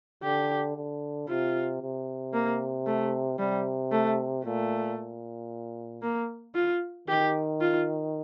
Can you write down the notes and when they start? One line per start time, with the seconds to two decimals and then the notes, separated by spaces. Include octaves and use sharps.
0.23 D3 G4
0.76 D3
1.28 C3 F4
1.82 C3
2.34 A#3
2.87 A3
3.39 C3 G3
3.92 A3
4.45 A#2 A3
4.97 A#2
6.02 A#3
6.55 F4
7.08 D#3 G4
7.60 F4